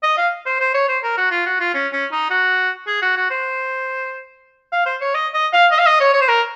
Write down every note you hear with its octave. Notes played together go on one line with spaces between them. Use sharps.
D#5
F5
C5
C5
C#5
C5
A#4
F#4
F4
F#4
F4
C#4
C#4
D#4
F#4
G#4
F#4
F#4
C5
F5
C5
C#5
D#5
D#5
F5
D#5
F5
D#5
C#5
C#5
C5
A#4